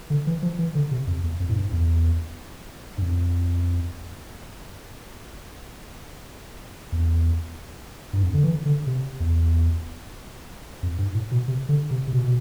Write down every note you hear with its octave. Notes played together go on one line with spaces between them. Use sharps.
D3
E3
F3
E3
D3
C3
F2
E2
F2
A2
G2
E2
G2
F2
E2
G2
F2
D3
E3
D3
C3
E2
F2
G2
A2
B2
C3
D3
C3
C3
B2
B2